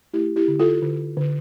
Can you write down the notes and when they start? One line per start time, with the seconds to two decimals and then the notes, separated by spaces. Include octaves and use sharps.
0.14 A3 E4 G4
0.36 E4 G4
0.48 D3
0.59 F4 A4
0.82 D3
1.17 D3